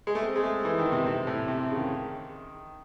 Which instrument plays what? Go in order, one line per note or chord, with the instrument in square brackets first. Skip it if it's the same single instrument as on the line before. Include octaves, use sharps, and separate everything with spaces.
[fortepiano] G#3
A3
C4
G#3
A3
E3
D#3
C3
C3
A2
C3
C#3
D#3